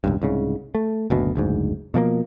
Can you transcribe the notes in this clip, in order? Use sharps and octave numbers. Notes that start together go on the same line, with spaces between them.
E1 C#2 G2
C2 G#2 C#3
A3
F#1 D2 B2
F#1 D2 G#2
B2 F3 A3 A#3